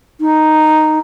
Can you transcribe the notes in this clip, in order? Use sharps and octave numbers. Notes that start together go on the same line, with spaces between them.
D#4